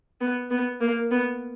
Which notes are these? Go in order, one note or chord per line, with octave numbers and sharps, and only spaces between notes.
B3
B3
A#3
B3